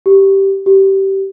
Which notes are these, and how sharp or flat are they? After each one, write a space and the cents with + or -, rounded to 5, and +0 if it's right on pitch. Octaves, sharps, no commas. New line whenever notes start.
G4 -10
G4 -20